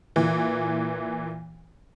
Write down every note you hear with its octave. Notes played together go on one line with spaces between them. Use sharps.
A#2 E3